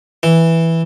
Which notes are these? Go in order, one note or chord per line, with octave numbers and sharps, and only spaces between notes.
E3